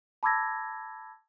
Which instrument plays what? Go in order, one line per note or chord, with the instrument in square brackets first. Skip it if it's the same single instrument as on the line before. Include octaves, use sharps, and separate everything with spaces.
[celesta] A5 B5 D6 E6 G#6 A#6